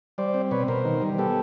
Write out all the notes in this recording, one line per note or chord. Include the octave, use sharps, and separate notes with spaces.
G3 C5 D5
C4
B2 B4 C#5
B2 A#4 C5
D#3
G3
B3 G4 A4